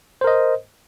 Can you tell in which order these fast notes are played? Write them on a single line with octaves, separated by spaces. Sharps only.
C5 A#4 D#5